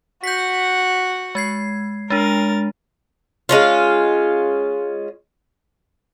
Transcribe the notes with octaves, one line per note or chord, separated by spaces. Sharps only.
F#4 F#5 G6 B6
G#3 G#6 C7
G#3 D4 A#4 A6
G#3 C#4 F4